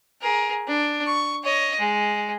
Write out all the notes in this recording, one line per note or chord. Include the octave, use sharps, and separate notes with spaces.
G#4 A#4
D4
C#6
C#5 D#5
G#3